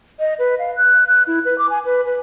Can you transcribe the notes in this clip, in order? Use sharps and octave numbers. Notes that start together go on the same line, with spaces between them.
D#5
B4
F5
F#6
F#6
E4
B4
D6
G#5
B4
B4